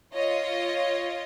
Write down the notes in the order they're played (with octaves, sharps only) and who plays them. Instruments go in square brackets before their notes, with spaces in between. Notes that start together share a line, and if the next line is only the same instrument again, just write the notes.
[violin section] F4 C#5 D#5